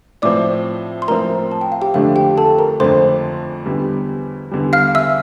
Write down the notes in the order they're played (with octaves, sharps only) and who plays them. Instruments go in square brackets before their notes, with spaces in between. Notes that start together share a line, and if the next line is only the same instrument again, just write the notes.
[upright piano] A2 F3 C4 [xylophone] D5 D6
[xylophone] C6
[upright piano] A2 F3 C4 [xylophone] A#4 A#5
[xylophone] A5
G5
F5
G4 G5
[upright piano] F2 D3 F3 A3 D4 [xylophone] F5
[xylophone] G4 G5
A4 A5
A#4 A#5
[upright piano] F2 D3 F3 A3 D4 [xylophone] C5 C6
[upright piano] E2 D3 G3
E2 D3 G3
[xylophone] F5 F6
E5 E6